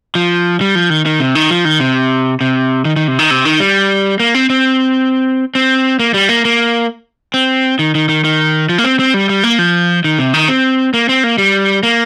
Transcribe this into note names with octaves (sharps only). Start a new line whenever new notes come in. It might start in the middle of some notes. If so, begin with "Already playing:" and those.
F3
G3
F3
D#3
D#3
C3
D#3
F3
D#3
C3
C3
D#3
D#3
C3
D#3
C3
D#3
G3
A#3
C4
C4
C4
A#3
G3
A#3
A#3
C4
D#3
D#3
D#3
D#3
F3
A#3
C4
C4
G3
G3
A#3
F3
D#3
C3
D#3
C4
A#3
C4
A#3
G3
A#3